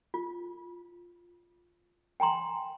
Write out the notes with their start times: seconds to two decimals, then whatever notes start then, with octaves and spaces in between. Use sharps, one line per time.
0.14 F4
2.20 G5 G#5 A#5 C6